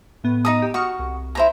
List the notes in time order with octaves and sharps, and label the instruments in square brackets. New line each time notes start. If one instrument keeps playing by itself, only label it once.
[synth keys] A2 B3
[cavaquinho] D#4 A#5 D#6
[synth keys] G4
[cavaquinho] F#4 [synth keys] C#6 D#6 F6
[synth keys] C2
[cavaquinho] E4 C5 A#5